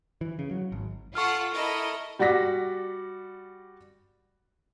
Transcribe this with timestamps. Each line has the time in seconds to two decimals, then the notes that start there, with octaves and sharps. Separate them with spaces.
0.21 E3
0.39 C#3
0.51 F#3
0.72 G#1
1.15 F4 A4 F#5 C#6 F6
1.54 E4 A4 A#4 D#5
2.19 G3 F#4 D5 A#6 B6